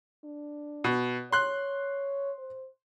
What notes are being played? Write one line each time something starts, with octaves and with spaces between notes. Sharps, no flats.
D4
B2
C#5 C6 F#6
C5